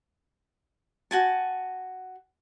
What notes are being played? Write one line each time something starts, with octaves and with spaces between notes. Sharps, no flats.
F#4 G#5 A5